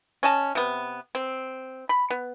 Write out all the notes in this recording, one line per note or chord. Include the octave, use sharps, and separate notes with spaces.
C#4 D#5 A5
C3 B3
C4
B5
B3